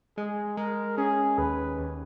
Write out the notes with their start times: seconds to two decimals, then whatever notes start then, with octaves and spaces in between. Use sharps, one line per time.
0.17 G#3 G#4
0.57 G#3 A#4
0.98 C#4 G#4
1.38 D#2 B4
1.78 D#2